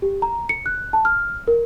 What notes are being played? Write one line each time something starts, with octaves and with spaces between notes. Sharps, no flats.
G4
A#5
C#7
F#6
A5
F6
A#4